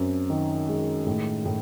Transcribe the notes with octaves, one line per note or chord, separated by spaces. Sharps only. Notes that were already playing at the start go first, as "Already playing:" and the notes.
Already playing: F#2 C4
D#3
G#3
A2
A2